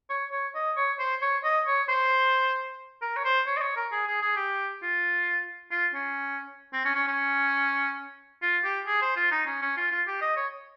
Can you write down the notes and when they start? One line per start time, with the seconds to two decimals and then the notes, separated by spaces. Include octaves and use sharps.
0.10 C#5
0.32 C#5
0.55 D#5
0.77 C#5
0.99 C5
1.22 C#5
1.44 D#5
1.67 C#5
1.89 C5
3.02 A#4
3.17 C#5
3.25 C5
3.47 C#5
3.57 D#5
3.61 C#5
3.76 A#4
3.92 G#4
4.07 G#4
4.22 G#4
4.36 G4
4.82 F4
5.71 F4
5.94 C#4
6.73 C4
6.85 C#4
6.95 C#4
7.07 C#4
8.42 F4
8.65 G4
8.87 G#4
9.02 C5
9.16 F4
9.31 D#4
9.46 C#4
9.62 C#4
9.77 F4
9.91 F4
10.07 G4
10.21 D#5
10.37 C#5